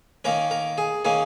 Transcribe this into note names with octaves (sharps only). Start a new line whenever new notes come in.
D#3 A#3 C#4 A#4
A#4
G#4
D#3 A#3 C#4 G#4